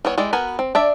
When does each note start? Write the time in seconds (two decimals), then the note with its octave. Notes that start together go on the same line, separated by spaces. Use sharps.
0.05 E3 G3 B3 C#5
0.18 G#3 E4 G4 D5
0.33 B3 F#4 A#4 B4 G#5
0.59 C4
0.75 D4 D5 E5